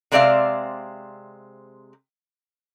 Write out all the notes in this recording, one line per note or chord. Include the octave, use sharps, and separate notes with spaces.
C3 G#3 C4 D5 E5 F5